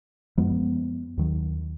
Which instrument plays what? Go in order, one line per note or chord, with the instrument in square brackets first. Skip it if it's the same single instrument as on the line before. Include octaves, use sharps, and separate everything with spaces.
[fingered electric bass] F#2 F3 G#3 B3
D#2 D#3 F#3